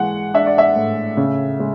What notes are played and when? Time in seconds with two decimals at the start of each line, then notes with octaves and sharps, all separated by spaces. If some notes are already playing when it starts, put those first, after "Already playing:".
Already playing: E3 G#3 F#5
0.34 D4 E5
0.46 D5
0.58 E5
0.75 A2
1.17 C#3
1.60 G#3